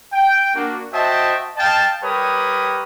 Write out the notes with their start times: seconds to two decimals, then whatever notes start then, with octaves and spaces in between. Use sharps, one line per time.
0.12 G5
0.54 A#3 D4 F#4
0.93 F#4 C5 D#5 E5 G5 A5
1.57 D#5 F5 G5 A5
2.03 G3 G4 A#4 B4 C#5 D#6